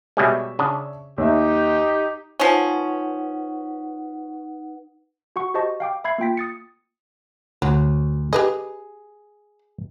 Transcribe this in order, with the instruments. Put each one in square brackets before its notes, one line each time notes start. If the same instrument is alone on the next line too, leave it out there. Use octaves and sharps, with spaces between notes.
[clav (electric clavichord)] B2 G3 G#3 [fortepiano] C#5 E5
[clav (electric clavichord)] C#3 D4
[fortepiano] D#2 E5 [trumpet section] D#4 G4
[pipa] F3 C#4 [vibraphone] D#4 B4 F#5
[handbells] F#4 F#5 C#6
F#4 G4 C5 D#5 A5 C#6
F5 G5 D6
E5 B5 G#6 C7
A#3 F4 G5 B6
D#6 A6 C#7
[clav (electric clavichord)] D2 [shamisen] F#3
[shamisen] G4 B4 D#5 [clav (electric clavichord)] G#4